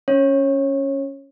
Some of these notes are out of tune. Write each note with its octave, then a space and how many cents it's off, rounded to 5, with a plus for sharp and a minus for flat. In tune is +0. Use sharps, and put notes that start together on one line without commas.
C#4 +0 C#5 -20